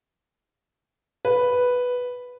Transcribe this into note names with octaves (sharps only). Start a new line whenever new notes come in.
B4